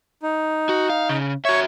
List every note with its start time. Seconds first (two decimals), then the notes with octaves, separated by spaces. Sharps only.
0.22 D#4
0.69 F#4
0.90 F5
1.09 C#3
1.45 F#4 C#5 E5 C#6